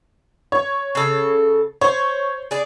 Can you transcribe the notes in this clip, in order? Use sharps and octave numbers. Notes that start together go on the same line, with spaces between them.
C#5
C#3 A4
C5 C#5
G#4 D5